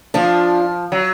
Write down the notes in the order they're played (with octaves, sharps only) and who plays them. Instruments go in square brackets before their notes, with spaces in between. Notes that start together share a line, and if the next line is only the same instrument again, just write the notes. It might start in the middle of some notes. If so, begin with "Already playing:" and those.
[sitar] F3 [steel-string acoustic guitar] D4 F4
[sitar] F#3